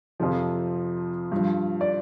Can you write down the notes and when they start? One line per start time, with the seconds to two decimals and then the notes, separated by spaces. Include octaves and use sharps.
0.20 F2 C3 F3
1.32 G2 F3
1.81 D5